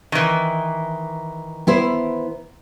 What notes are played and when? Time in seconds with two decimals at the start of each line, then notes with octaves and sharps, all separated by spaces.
0.12 D#3 E3
1.67 B3 E4 C5